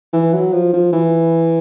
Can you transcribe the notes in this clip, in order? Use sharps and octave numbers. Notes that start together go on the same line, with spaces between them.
E3
F#3
F3
F3
E3